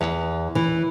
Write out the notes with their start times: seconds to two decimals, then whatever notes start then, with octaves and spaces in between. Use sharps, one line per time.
0.01 E2
0.55 E3